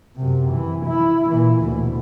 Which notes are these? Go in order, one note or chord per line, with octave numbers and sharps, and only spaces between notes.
F#2 C3
E3
E4
A#2 E3
D2 B2